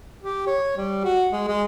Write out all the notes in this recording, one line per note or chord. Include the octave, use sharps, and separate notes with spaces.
G4
C#5
G3
F#4
G#3
G#3